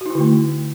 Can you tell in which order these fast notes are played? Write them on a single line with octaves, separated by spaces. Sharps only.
F#4 D#4 E4 D3 A3